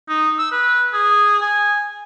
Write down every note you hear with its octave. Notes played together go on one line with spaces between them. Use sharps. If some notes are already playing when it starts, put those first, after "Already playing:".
D#4
E6
B4
G#4
G#5